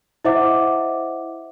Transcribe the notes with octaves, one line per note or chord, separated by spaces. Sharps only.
E4 C5 D#5 E5 F#5 D6